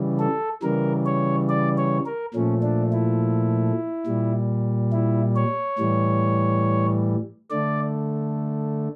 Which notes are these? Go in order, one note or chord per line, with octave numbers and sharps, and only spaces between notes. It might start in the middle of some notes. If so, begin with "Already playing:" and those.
Already playing: C#3 E3 G3
A4
C#3 E3 G3 A#4
C#5
D5
C#5
A#4
A#2 F3 A3 C#4
D4
E4
A#2 G3
E4
C#5
A2 E3 G3
D3 A3 D5